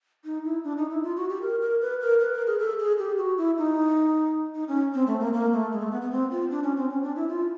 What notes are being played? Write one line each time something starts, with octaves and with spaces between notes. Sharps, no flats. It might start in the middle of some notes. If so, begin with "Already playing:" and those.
D#4
E4
D4
D#4
E4
F4
F#4
G4
A#4
A#4
B4
A#4
B4
A#4
G#4
A4
G#4
G4
F#4
E4
D#4
D#4
C#4
C4
A3
A#3
A#3
A3
G#3
A3
B3
B3
C4
F4
D4
C#4
C4
C#4
D4
E4
F4